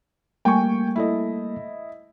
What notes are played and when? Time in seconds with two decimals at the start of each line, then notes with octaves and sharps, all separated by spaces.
0.45 G3 A3 A#3 G5 G#5 C#6
0.96 E4 A4 D#5